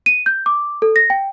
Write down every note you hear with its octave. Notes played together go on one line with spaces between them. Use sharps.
D#7
G6
D6
A4
A#6
G5